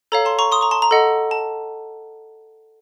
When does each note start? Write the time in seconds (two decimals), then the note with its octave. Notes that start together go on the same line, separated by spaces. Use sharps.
0.12 A4 C#5 F5 A#5
0.25 A5 C6
0.39 A#5 C#6
0.52 C6 D#6
0.61 A#5 C#6
0.71 A5 C6
0.82 A#5
0.91 A4 D#5 F#5
1.31 A5